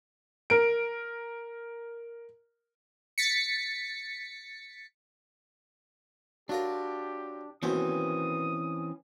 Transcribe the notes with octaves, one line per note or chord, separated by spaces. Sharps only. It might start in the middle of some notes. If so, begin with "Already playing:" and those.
A#4 D7
A6 B6 C#7
F#3 D4 F4 G4 A#4
D#2 B2 E3 C4 C#4 C5 D#6